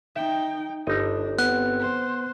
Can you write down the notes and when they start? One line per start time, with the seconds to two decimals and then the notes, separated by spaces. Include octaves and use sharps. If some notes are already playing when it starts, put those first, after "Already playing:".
0.16 D#4 E5 G5
0.87 G1 D4 D#4 D#5
1.39 B3 C4 F#6
1.80 C5